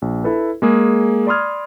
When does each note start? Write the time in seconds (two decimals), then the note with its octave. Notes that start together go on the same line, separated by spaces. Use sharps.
0.02 A#1
0.24 E4 A4 B4
0.62 G#3 A#3 G#4
1.27 D5 B5 C6 D#6 F6 G#6